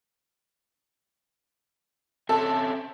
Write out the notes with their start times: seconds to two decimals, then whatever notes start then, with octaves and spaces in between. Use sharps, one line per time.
2.29 C4 C#4 A4 E5